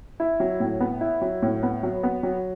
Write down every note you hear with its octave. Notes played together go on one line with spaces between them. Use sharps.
E4
F#3
A2
B3
E4
F#3
A2
B3
F#3
B3
F#3